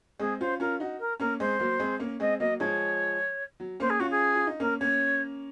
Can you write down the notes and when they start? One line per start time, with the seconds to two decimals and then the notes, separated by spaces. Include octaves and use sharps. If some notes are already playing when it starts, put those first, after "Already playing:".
0.20 G#3 C4 G#4
0.40 C#4 F4 C5
0.60 C#4 F4 A#4
0.80 D#4 F#4
1.00 A#4
1.20 A#3 C#4 A#4
1.40 G#3 C4 C5
1.60 F#3 A#3
1.80 G#3 C4
2.00 A#3 C#4
2.20 G#3 C4 D#5
2.40 F#3 A#3 D#5
2.60 F3 G#3 C#5
3.60 F#3
3.80 A#3 C#4 C5
3.90 G#4
4.00 C#4 F4 F#4
4.11 G#4
4.35 F4
4.47 D#4
4.60 A#3 C#4 A#4
4.80 A#3 C#4 C#5